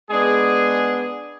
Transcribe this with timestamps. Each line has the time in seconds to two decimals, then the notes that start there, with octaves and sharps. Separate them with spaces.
0.10 G#3 B3 D4 G#4